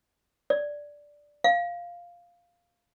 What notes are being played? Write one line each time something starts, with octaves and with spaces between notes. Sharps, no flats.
D5
F5